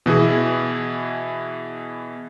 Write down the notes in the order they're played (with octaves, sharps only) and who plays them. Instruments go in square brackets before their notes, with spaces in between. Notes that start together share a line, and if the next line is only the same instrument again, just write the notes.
[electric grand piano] B2 E3 E4 G#4